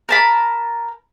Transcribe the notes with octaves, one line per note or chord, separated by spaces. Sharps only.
A#4 A5 B5